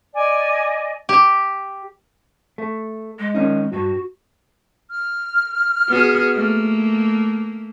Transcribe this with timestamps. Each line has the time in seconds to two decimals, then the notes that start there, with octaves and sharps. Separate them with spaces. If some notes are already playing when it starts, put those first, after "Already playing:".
0.14 D5 D#5 G#5
1.09 G4
2.58 A3
3.19 G#3
3.35 D#3 C#4 D#4
3.72 G2 F#4
4.91 F6
5.88 B3 F#4 G#4
6.35 A3 A#3